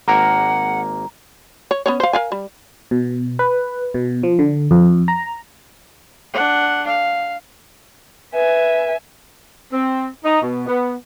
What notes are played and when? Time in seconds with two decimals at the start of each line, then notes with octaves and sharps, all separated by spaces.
0.08 G#1 A#3 A#4 F#5 A#5
1.71 C#5
1.86 B3 C#4 C#5
2.00 C5 F5
2.13 A#4 F5 G#5
2.32 G3
2.91 B2
3.39 B4
3.94 B2
4.23 F3
4.39 D3
4.71 F2
5.08 A#5
6.34 D4 F#5
6.86 F5
8.34 B4 E5 G#5
9.72 C4
10.23 D#4
10.42 B2
10.67 B3